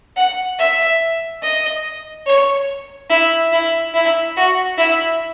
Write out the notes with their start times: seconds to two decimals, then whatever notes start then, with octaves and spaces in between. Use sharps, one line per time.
0.16 F#5
0.58 E5
1.42 D#5
2.26 C#5
3.09 E4
3.52 E4
3.94 E4
4.36 F#4
4.77 E4